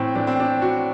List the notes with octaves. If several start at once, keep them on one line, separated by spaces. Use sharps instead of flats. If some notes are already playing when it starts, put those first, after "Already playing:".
Already playing: A2 E3 C4
A2 E3 D4
C4
D4
F#4